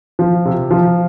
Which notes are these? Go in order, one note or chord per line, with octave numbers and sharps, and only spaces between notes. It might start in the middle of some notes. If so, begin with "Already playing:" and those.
F3
C3
F3